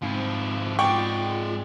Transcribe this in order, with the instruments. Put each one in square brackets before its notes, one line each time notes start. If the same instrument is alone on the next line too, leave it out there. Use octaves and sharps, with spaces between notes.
[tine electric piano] G#2 C4 [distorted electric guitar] F3 E4
[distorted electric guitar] G#3 D5 [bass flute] F4 [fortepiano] F#5 G5 C#6